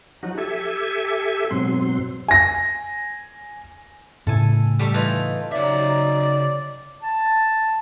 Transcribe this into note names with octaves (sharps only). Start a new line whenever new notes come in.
F3 F#3 D#4 F#4
G4 A4 E5 G#5
G#2 B2 F#3 C4 C6
G#5 A#6
A2 C#3 A4 G#5
G3 A3 E5
E3 D#4 F4
C#3 F#3 D#4 D5 E5
A5